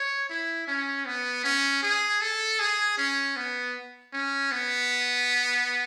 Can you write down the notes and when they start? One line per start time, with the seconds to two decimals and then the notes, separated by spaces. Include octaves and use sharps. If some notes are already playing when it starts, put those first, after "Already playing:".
Already playing: C#5
0.29 E4
0.68 C#4
1.06 B3
1.44 C#4
1.83 G#4
2.21 A4
2.59 G#4
2.98 C#4
3.36 B3
4.13 C#4
4.52 B3